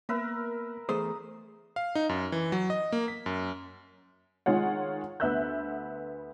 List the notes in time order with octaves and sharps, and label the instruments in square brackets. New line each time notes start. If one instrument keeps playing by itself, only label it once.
[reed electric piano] A#3 B3 [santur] A#4 B4 E5
[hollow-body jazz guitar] E2 A3 C5 [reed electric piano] G#4 [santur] D#6
[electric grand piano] F5
D#4
F#2
E3
F#3
D#5
A#3
B6
F#2
[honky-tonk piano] D#3 G#3 F4 C#5 F#5
D2 B3 E5 E6 F#6 G6